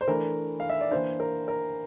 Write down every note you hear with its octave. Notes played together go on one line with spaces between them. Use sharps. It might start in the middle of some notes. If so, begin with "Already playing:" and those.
C5
E3 A3 D4 A#4
F5
E5
D5
E3 A#3 D4 C5
A#4
A#4